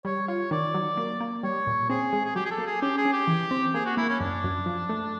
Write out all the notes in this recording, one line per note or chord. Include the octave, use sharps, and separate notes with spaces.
G3 C#5
F4 C#5
D#3 D5
F#3
A#3
A#3
G3 C#5
A#2
C4 G#4
G#3
G#4
F#3 G4
G#4
A4
A#3
G#4
C#4 G4
G#4
C#4
G4
E3
C4
A#3 G#4
F#4
A#3 E4
C#4
F#2 D4
F#2
F3
A3